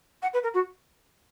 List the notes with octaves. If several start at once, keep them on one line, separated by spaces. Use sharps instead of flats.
F#5
B4
A#4
F#4